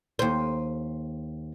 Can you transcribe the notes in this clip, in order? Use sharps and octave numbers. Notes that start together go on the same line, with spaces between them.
D#2 C5